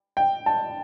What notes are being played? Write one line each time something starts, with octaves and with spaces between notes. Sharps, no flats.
G5
A5